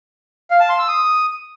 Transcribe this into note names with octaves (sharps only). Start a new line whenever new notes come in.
F5
A5
C6
E6
D#6